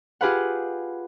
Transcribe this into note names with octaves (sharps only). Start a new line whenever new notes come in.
F4 G4 G#4 B4 F5 F#5